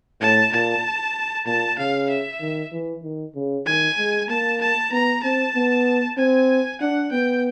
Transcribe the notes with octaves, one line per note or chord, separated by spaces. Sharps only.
A2 A5
A#2 A5
A#2 A5
C#3 F5
E5
D#3
E3
D#3
C#3
D#3 G#5
G#3
A#3 A5
A5
B3 A#5
C4 A5
B3
C4 G#5
D4 F#5
B3 G5